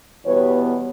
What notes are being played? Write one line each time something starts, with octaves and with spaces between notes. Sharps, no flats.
E2 B2 G3 B3 B4 C#5